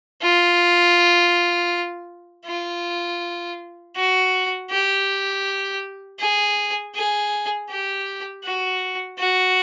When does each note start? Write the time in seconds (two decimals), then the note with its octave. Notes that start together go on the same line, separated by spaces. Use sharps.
0.22 F4
2.45 F4
3.96 F#4
4.71 G4
6.19 G#4
6.95 G#4
7.69 G4
8.44 F#4
9.18 F#4